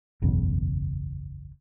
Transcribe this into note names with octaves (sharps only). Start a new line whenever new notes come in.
F#1 B1 E2 C#3